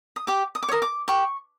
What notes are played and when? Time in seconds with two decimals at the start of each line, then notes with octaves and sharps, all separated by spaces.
0.16 D#6
0.27 G4 D6
0.55 D#6
0.63 D6
0.69 C#5
0.71 A#4 D#6
0.82 D6
1.08 G4 C#6